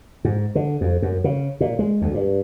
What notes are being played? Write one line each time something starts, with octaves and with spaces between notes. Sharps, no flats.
G#2
D3
F2
F#2
C#3
A#2
G#3
D2
G2